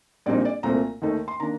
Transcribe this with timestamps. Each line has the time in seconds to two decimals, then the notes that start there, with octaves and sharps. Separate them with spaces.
0.26 A#1 A#2 G3 C4 D#4 D5
0.45 D5
0.63 C2 A#2 A3 C4 A#5
1.02 D#2 D#3 A3 D#4
1.28 C6
1.40 D#3 A#3 D4 A#5